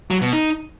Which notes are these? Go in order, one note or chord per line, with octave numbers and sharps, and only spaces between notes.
F#3
B2
D#4